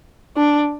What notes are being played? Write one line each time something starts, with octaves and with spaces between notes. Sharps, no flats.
D4